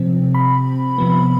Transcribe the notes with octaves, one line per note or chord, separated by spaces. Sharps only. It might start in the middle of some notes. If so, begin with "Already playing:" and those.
Already playing: C3 F3 C4
B5
C3 F3 B3